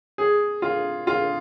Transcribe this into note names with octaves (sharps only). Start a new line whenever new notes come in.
G#4
F4
F4